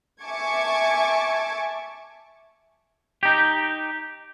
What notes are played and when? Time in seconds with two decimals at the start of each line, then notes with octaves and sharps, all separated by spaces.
0.23 E5 G#5 A5 C#6 D6 G#6
3.23 D#4 G4